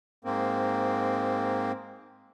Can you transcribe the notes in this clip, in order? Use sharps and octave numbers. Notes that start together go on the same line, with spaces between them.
G#2 A#3 C4